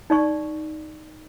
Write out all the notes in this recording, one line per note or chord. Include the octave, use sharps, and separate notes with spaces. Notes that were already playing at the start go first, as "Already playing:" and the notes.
D#4 D5 C#6